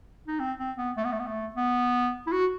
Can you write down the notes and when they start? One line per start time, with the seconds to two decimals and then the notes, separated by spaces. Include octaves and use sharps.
0.27 D#4
0.40 C4
0.59 C4
0.78 B3
0.97 A3
1.04 B3
1.12 A3
1.19 B3
1.27 A3
1.56 B3
2.27 E4
2.32 F#4